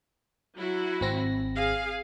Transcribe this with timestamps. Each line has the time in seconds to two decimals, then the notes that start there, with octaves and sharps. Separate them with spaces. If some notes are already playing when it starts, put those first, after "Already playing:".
0.55 F#3 E4 F#4
1.01 G#1 C4 A#6
1.55 G#4 F5